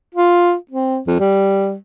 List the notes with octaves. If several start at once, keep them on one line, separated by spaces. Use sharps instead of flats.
F4
C4
F2
G3